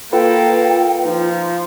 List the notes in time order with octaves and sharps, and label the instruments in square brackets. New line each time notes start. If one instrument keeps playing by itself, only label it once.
[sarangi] A#3 [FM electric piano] F4 B4 [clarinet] A4 [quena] G5
[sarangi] F3 [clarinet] D#4